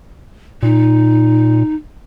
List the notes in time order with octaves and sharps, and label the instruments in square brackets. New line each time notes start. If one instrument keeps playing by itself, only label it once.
[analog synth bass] A#2 [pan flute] D#4